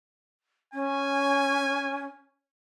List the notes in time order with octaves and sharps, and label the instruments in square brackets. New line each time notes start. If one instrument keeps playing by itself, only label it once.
[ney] C#4 [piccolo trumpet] G#5